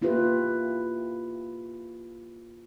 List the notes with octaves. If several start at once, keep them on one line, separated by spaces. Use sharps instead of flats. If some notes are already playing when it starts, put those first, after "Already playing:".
A#3 E4 F4 G4 B4